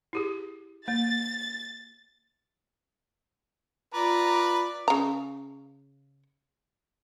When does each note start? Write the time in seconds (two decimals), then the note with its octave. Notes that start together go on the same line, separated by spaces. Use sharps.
0.13 E4 G4 G#4
0.88 A#3 A6
3.94 F4 B4 D5 A#5
4.88 C#3 A#5